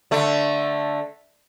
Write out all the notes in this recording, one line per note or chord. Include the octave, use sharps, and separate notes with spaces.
D3 A3